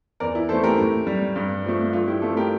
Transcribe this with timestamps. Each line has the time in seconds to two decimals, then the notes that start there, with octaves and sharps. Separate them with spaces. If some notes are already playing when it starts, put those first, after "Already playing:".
0.20 E2 A#4 D5
0.35 E4
0.49 E3 A4 C5
0.53 A3
0.64 G4 A#4
0.78 A2
1.07 G3
1.36 G2
1.65 F3 A3
1.93 G2 F4
2.07 E4 G4
2.22 F3 A3 F4 A4
2.37 G4 A#4